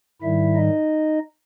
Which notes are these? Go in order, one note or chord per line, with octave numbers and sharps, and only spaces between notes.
G#2 D#3 G3 E4 E5
D#4 D#5